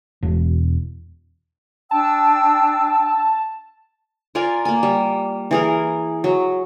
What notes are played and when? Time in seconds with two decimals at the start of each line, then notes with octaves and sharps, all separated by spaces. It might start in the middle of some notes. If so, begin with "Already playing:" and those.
0.23 E1
1.91 D4 G5 A5 E6
4.35 F4 A#4 D5 G#5
4.65 A#3 G#5
4.83 G3
5.51 E3 G#4 A#4
6.24 F#3